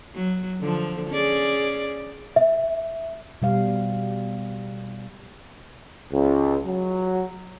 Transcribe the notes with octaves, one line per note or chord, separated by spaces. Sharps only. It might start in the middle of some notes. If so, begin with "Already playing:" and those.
F#3
D3 F3
C#4 G#4 D5
E5
B2 G3 F5
C#2
F#3